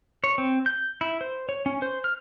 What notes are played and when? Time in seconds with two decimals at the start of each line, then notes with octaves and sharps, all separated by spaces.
0.24 C#5
0.38 C4
0.66 G6
1.01 E4
1.21 C5
1.49 C#5
1.66 C#4
1.82 C5
2.04 F6